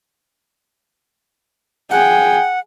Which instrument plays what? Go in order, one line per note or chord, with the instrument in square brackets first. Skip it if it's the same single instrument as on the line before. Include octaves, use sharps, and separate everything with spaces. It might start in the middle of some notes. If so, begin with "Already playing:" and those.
[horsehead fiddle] G#4 G5 [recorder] F#5